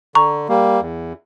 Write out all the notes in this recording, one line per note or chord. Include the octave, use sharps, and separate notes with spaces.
D3 A#5 C#6
G3 A#3
E2